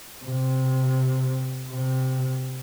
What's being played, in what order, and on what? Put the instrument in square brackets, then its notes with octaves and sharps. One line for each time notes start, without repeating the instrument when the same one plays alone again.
[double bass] C3
C3